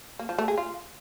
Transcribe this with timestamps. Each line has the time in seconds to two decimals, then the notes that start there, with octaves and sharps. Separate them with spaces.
0.19 A#3
0.29 F3
0.38 A3
0.48 G#4
0.58 F4